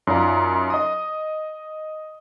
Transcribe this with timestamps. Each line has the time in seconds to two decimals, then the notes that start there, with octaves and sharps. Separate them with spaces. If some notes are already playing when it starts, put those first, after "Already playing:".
0.07 F#2 D#4 F4 D5 A#5
0.70 D#5 D#6